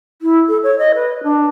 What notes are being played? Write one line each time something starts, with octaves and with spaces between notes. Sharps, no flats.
E4
A4
C#5
D#5
B4
D4